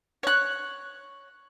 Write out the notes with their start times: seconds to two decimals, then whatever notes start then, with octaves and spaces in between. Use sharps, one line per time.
0.23 C#5 F#6